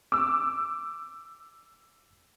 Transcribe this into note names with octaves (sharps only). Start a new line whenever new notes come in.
D6 E6